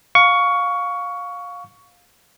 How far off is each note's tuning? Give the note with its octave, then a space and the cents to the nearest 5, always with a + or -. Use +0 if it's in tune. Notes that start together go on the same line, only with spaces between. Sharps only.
F5 +20 C#6 +15